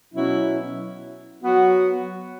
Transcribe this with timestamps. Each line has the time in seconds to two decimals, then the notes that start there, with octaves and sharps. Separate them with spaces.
0.13 B2 F#3 C#4 E4
1.43 F#3 B3 F#4